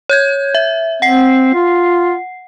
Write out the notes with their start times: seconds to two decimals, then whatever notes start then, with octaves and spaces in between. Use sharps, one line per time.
0.09 C#5 G6 G#6
0.55 E5
1.02 C4 F#5 C7
1.54 F4